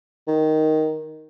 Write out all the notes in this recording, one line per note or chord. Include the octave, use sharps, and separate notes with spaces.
D#3